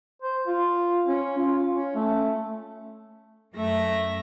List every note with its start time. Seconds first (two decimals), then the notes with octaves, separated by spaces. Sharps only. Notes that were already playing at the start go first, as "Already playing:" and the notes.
0.22 C5
0.47 F4
1.07 C#4
1.38 F4
1.74 C#4
1.95 A3
3.55 F#2 A3 E5 A#6